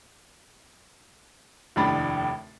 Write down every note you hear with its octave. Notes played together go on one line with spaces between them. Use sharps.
F1 D#2 A2 D4 B5 A6